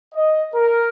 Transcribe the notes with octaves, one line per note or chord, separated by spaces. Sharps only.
D#5
A#4